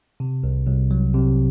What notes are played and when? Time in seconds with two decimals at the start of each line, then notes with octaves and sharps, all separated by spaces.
0.20 C3
0.43 C2
0.67 C2
0.91 F#3
1.14 C3